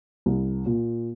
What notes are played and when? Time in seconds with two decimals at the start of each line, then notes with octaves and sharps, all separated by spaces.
0.26 C2
0.66 A#2